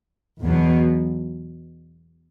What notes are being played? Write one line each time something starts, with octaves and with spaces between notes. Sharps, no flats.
E2 B2 F#3